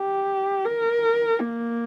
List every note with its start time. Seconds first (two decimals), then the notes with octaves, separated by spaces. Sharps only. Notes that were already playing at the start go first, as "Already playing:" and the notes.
Already playing: G4
0.65 A#4
1.39 A#3